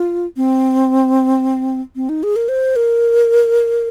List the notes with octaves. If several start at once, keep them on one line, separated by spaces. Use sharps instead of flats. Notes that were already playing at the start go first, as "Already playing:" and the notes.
Already playing: F4
C4
C4
D#4
G#4
A#4
C5
A#4